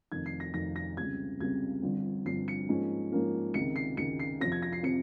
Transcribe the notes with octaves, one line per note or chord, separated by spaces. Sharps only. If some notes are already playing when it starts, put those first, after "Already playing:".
F1 F2 D#3 G#6
C7
A#6
F1 F2 D#3 A#6
A#6
C#2 C3 G3 C4 G#6
C#2 C3 G3 C4 G#6
G1 G2 F3 C4
G1 G2 F3 C4 C7
C#7
G#2 F3 A#3 C#4
G#2 F3 A#3 C#4
C#2 C3 D#3 C#7
C7
C#2 C3 D#3 C#7
C7
F2 C3 F3 C4 A#6
G#6
A#6
C7
C3 F3 C4 C#7